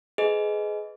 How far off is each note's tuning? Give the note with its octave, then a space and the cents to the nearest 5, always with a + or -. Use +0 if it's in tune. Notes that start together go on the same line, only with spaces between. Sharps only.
G#4 +20 B4 +30 D#5 +0